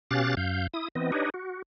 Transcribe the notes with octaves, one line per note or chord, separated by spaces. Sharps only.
B2 C#4 G4 F5 F#6 A6
F#2 F5 G6
E4 D#6
E3 B3 C4 D#5
D4 D#4 G4 B4 C#5 D#5
F#4